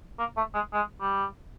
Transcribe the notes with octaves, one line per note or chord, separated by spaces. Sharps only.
A#3
A3
G#3
G#3
G3